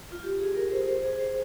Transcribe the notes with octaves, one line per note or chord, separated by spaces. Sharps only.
F4
G4
G#4
A#4
C5
C5
G#4
C5